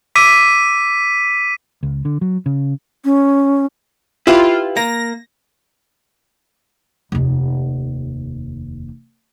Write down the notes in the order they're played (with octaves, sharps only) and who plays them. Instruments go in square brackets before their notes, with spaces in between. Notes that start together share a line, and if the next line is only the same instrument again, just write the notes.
[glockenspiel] D6 E6 D7 [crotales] B6 D#7
[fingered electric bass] C#2
D3
F#3
C#3
[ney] C#4
[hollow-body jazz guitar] E4 G4 B4 [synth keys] F4
[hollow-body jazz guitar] A#3 [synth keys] A#6
[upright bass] F1 D#2